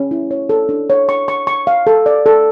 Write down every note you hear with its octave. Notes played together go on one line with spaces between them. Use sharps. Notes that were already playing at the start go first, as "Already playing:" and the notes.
Already playing: C#4
E4
C#5
A4
D4
C#5
C#6
C#6
C#6
F5
A4
D5
A4